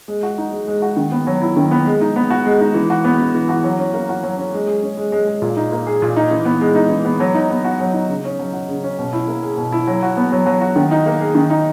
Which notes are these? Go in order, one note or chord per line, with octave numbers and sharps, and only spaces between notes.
G#3
F#4
D#4
G#3
G#3
F#4
D#3
B3
F#3
E4
D#3
B3
G#3
D#4
B3
F#4
G#3
D#4
E3
F#4
B3
E3
E3
F#4
F#3
C#4
A#3
F#4
F#3
C#4
G#3
G#4
C#4
G#3
G#3
G#4
A#2
D#4
A#3
G#4
A#2
D#4
E3
B3
G#3
D#4
E3
B3
F#3
D#4
B3
F#4
F#3
D#4
C#3
C#4
F#3
F#4
C#3
C#4
B2
E4
A#3
G#4
B2
E4
F#3
F#4
B3
F#3
F#3
F#4
D#3
D#4
A#3
G#4
D#3
D#4